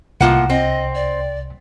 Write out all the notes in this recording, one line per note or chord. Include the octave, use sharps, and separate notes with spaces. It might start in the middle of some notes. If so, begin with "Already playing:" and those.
C2 A2 A#3 F4 F#5
C4 D#5
D5